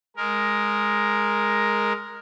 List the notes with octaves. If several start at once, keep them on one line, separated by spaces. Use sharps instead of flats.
G#3 A#4